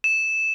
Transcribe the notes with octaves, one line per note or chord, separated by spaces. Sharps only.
E7